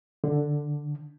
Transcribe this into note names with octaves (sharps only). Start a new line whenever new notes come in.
D3